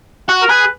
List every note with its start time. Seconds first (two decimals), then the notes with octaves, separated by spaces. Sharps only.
0.28 F#4 F#5
0.42 A#4
0.49 G#4 B4